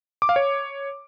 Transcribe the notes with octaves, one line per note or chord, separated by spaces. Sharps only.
D6
F5
C#5